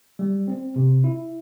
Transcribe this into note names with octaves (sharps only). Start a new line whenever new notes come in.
G3
C4
C3
E4